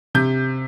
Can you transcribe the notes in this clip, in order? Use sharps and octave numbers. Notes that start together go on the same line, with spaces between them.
C3 G6